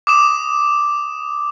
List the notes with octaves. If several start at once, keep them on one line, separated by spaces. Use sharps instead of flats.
D6 D#6 E7